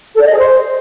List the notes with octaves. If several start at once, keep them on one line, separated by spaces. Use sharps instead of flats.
A4
D5
D#5
G#4
C5